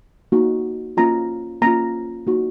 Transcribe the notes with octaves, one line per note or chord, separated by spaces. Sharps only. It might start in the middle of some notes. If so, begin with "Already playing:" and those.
A#3 D#4 F#4
A#3 C#4 F4 A#5
A#3 C#4 F4 A#5
A#3 D#4 F#4